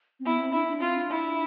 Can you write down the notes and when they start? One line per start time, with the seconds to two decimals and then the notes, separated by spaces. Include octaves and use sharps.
0.20 C4
0.25 B3 E4
0.39 C4
0.53 D4 E4
0.67 D4
0.81 C4 F4
0.96 D4
1.10 E4